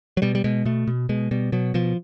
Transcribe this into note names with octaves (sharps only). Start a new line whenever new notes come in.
F#3
B2 G3
G3
B2 G#3
B2 A3
B2
B2 G#3
B2 G3
B2 F#3
B2 F3